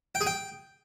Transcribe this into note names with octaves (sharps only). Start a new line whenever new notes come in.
G5
G#4
G5